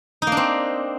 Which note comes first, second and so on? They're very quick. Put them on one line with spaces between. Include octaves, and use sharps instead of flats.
D#4 A#3 D4 C4